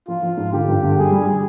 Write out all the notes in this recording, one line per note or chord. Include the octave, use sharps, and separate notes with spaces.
F3 F4
F3
G#2
D3 G4
G2
D3
G3 G#4
G3
G3